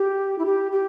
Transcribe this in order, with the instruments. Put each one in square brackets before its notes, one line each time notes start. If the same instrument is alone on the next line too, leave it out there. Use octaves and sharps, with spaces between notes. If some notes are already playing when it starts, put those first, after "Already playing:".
Already playing: [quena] G4
E4
G4
G4